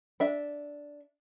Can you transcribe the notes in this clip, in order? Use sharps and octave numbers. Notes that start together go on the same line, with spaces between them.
D4 E5